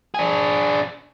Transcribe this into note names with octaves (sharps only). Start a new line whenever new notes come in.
D4 G#4